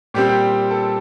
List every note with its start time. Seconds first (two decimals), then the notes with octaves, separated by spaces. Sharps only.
0.14 A#2 G3 C4 G4
0.29 G4
0.71 A4